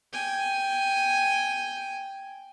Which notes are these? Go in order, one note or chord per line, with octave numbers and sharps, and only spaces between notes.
G5 G#5